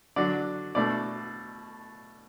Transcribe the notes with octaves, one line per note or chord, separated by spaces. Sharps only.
D3 F#3 D4 D5
B2 A3 D4 D5